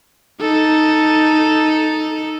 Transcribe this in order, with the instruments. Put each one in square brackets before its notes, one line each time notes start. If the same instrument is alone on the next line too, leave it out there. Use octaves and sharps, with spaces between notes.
[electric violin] D#4 A4